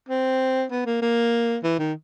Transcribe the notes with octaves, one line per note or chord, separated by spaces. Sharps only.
C4
B3
A#3
A#3
E3
D#3